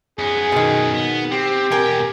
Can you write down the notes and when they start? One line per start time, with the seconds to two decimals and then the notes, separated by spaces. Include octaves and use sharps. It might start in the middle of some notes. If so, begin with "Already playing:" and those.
0.19 F#2 B3 G#4
0.52 B2 D#3
0.94 B3
1.31 C4 G4
1.72 B2 A#4 G5 G#5